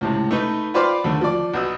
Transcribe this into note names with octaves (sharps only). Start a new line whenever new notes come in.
C#2 A2 C3
A3 D#4 B4
F4 B4 C5 D5 F5 G5
D#2 D3 A3
F3 D5
B1 B2 E6